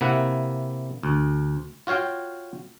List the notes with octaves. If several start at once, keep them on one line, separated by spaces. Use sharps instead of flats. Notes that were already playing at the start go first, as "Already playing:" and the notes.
C3 A#3 E4 F#5
D2
F4 F#4 C#5 F5 G5